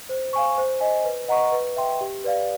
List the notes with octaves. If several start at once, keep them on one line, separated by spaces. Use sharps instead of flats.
C5
F5 G#5 C#6
C5
D#5 G#5
B4
D#5 F#5 A#5 C#6
B4
E5 G5 C6
G4
B4 D5 F5